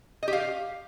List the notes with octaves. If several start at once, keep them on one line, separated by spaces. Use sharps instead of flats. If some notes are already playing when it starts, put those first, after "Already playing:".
D#5
G4
F5